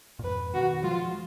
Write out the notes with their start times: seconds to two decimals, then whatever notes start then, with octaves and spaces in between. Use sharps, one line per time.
0.19 A#2
0.24 F2 G#2 B4
0.54 B2 D#3 F#4
0.83 F3 G#3 F4